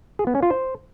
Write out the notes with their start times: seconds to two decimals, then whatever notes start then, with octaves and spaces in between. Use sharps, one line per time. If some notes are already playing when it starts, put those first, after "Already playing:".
0.19 G#4
0.27 B3
0.35 C#4
0.43 F4
0.50 C5